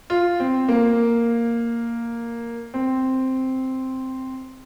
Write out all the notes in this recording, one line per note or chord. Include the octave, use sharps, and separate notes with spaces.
F4
C4
A#3
C4